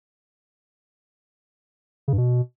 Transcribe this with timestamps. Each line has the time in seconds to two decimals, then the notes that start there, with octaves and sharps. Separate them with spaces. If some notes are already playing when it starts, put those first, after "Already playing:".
2.08 C#3
2.13 G2
2.18 B2